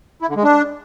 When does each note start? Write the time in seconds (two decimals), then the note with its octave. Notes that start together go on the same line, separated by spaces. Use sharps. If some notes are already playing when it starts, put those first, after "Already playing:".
0.22 E4
0.29 D3
0.37 G#3
0.44 D4